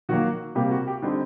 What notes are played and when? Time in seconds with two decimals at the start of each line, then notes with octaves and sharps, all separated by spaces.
0.09 D#3 F#3 A#3 F#4
0.55 C3 G3 A#3 G4
0.71 F#4
0.87 G4
1.02 D3 G3 C4 D#4